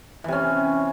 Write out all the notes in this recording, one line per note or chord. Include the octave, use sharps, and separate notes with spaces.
C3 E3 C#4